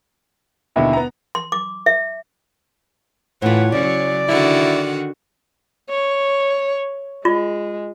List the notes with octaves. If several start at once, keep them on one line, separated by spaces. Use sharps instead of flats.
D#2 B2 D3 E4
B3 A#5
C6
D6
E5
A2 E3 F4 C#5 F#5
C#3 F#3 D5
D3 D#3 E4 F#4
C#5
G#3 F4